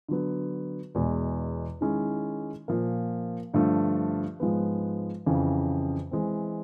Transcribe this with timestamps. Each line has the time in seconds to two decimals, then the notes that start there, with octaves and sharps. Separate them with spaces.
0.08 D3 F#3 B3
0.95 E2 B2 G#3
1.81 D#3 G#3 C#4 E4 G#4
2.68 A#2 F3 A#3
3.54 G2 D3 F3 A3
4.40 G#2 F3 G#3 B3
5.26 F2 C#3 E3
6.11 E3 G#3 C4